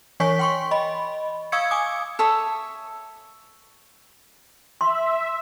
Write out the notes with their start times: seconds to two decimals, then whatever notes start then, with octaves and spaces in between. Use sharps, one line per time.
0.20 E3 C#5 G#5 C#6 B6
0.39 G5 C6 C#6
0.71 D#5 B5
1.52 F5 C#6 D#6 E6 G#6 C#7
1.71 G#5 D6 D#6
2.19 A4 C#5 E5 D#6
4.81 E5 C6